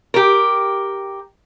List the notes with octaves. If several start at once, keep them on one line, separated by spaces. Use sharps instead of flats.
G4 A#4